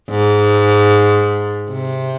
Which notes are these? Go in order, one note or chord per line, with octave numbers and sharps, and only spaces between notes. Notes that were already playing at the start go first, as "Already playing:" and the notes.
G#2
C3